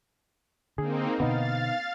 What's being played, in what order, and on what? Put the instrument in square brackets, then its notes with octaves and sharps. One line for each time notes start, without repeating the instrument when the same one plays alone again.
[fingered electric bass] D3 [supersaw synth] A#3 C4 D#4 [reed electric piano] G#4
[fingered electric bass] B2 D3 [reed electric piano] B3 D#4 [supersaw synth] F5 A6